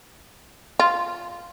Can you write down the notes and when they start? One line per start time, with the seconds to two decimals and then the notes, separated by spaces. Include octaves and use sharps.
0.79 F4